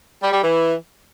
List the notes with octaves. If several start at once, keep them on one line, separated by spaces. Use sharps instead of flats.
G3
G3
E3